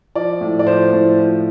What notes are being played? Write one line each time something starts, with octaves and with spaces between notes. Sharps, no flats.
F3 D5
A2
D5
F3 C5
A2
F3